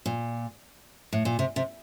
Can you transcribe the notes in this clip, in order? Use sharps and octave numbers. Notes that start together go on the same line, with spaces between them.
A#2
A2
A#2
C3
C3